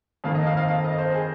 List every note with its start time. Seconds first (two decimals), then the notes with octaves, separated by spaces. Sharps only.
0.24 F2 D#3 A#3 F5
0.35 D#5
0.47 F5
0.57 F5
0.68 F5
0.84 D#5
0.99 C5
1.14 G#4